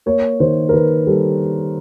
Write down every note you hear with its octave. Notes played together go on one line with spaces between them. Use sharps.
A#3 C#5
D#3 C5
A#4
D#3 B4
G3 A4